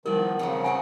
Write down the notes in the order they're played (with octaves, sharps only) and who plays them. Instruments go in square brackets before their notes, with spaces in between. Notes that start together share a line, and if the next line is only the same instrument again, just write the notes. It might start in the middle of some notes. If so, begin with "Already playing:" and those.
[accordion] D#3 F3 [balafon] G3 E4 [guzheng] B3 D5 [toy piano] A#4
[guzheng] F2 F3 F#3 [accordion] C#3
[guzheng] F#3 C#4 D#4 [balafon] F#5 [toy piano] G#5